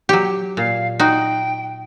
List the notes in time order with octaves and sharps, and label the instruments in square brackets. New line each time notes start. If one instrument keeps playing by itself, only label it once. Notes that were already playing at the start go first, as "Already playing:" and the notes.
[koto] F#3 G4
[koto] A#2 [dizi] F5
[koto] D#4 F#4 [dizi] G5